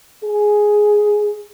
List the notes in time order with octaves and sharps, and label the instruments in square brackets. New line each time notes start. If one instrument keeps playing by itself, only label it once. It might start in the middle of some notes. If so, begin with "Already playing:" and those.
[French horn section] G#4